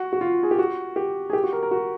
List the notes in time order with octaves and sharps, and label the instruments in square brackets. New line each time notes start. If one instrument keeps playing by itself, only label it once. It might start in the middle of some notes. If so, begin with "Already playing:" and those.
Already playing: [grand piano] F#4
F#4
F4
G#4
G4
F#4
G4
G#4
G4
F#4
A#4
A#4
F#4